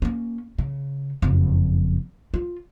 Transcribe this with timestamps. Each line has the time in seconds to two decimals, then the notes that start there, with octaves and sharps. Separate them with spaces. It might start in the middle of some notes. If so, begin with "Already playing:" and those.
0.02 A#3 C#4
0.58 C#3
1.22 F#1 F2
2.34 F4